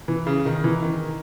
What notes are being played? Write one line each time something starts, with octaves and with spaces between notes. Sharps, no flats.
E3
C#3
D#3
E3
D#3